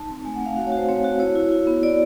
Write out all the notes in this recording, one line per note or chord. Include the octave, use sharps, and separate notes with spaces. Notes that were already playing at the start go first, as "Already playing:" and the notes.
Already playing: D#4 A5
C4
A3 G#5
F#5
A3
F5
F#4 F5
C#5
F#4
C5
C4 C#5
F#4
E4 C#5
E4
E4
B3
E4 D5